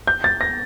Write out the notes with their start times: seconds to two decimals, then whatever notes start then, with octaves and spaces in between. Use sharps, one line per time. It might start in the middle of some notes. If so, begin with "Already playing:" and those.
0.07 G6
0.24 A6
0.41 A#6